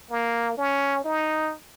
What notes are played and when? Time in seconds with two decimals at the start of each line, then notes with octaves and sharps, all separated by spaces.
0.11 A#3
0.57 C#4
1.05 D#4